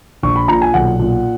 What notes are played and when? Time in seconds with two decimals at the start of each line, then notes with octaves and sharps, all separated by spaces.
0.23 A#1 C#6
0.36 B5
0.48 A#2 A#5
0.62 G#5
0.74 B1 F#5
0.99 A#2